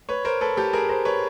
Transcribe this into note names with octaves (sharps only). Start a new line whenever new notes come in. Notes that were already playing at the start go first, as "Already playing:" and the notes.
B4 C#5
A#4 C5
A4 B4
G4 A4
G#4 A#4
A#4 C5
B4 C#5